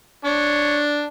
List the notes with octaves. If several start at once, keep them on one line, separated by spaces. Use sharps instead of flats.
D4 C#5